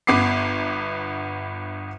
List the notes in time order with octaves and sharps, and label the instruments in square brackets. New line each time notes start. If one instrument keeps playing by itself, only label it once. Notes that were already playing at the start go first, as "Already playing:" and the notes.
[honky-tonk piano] G1 B3 D6 C7